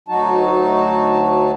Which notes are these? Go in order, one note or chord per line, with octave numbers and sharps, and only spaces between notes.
D2 F#3 D#4 F#4 A5